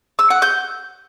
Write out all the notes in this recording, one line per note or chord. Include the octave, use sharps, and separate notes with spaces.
E6
F#5
G6